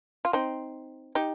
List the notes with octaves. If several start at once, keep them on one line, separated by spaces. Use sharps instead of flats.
F4
C4 D#4
D#4 G4